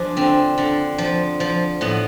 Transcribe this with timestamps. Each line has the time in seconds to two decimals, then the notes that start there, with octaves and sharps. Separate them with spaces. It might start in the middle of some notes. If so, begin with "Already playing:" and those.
Already playing: F3 D4 G#4
0.17 D3 C4
0.58 D3
0.98 F3
1.40 F3
1.81 A2 B3